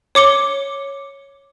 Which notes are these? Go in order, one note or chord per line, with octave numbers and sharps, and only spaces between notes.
C#5 D6 C#7 G7